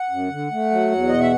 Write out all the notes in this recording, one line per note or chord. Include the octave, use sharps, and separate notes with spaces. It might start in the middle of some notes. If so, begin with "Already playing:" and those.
Already playing: F#5
F#2
D3
A3
F#3
E2
B2 D#5
E5